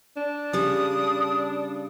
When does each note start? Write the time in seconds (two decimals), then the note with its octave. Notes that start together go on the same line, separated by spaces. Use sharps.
0.17 D4
0.53 C#3 G3 D#6